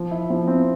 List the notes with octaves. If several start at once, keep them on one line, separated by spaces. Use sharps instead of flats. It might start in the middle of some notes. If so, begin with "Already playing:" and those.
Already playing: F3
E4
F3
C4